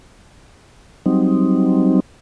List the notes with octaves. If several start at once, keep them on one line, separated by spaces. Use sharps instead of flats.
F#3 G3 C4 D#4